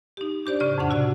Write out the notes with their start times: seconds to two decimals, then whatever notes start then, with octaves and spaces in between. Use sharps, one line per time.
0.17 D#4 G4
0.46 D4 G4 C5 D5
0.60 A2 C#3 D5
0.78 F2 A2 D4 F#5
0.90 C3 F#4 D5 E6